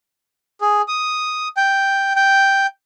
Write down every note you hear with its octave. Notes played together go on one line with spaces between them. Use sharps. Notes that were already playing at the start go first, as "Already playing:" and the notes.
G#4
D#6
G5
G5